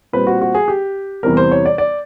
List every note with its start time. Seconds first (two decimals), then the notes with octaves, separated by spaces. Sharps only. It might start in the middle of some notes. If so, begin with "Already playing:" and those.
0.13 A#2 G3 C4 B4
0.27 F#4
0.41 F#4
0.55 G#4
0.68 G4
1.23 E2 C3 E3 G3 C4 A#4
1.37 C5
1.51 C#5
1.66 D5
1.78 D5